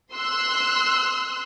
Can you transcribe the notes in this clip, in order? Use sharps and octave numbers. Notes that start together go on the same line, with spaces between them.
C6 E6 F#6